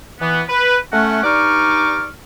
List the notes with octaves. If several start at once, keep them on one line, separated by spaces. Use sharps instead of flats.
E3 B3
B4
A3 C#4 F#5
G2 D#4 D5 C#6 D6 F6